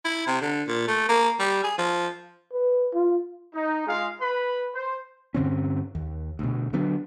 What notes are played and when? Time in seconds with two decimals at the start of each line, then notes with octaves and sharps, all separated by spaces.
0.05 E4
0.27 C3
0.41 D3
0.67 A#2
0.88 A3
1.09 A#3
1.39 G3
1.64 G#4
1.78 F3
2.53 B4
2.94 F4
3.54 D#4
3.87 G#3 F4 G#4 F5
4.20 B4 B5
4.74 C5
5.34 G2 D3 C4 C#4
5.95 D#2
6.39 D2 B2
6.73 D3 F#3 B3 D4